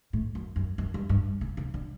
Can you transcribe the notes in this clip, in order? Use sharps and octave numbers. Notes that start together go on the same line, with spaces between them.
A2
F#2
F#2
F#2
G2
G2
C#3
C#3
D3